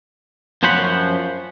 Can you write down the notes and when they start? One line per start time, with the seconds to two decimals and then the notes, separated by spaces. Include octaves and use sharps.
0.63 F#2 F3 C#4 C5 F#5 B5